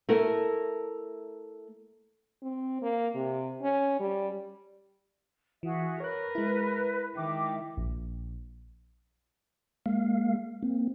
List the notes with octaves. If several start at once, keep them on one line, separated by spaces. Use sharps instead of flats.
A3 E4 A#4
C4
A#3
C3
C#4
G3
E3 F#4 G#4 E5
A#4 B4 C#5 F#6
G#3 E4
D#3 E5 G5 D6
A#1
G#3 A#3 F5
A#3 C4